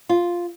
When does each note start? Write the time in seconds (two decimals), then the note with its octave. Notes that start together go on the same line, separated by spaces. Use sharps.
0.09 F4